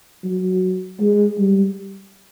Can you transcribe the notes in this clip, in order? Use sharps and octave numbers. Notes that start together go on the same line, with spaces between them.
F#3
G#3
G3